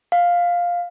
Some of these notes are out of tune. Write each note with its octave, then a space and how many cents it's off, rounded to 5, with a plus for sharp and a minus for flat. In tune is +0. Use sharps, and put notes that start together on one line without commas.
F5 +5